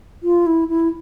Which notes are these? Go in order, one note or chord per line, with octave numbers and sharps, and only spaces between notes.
F4
E4
E4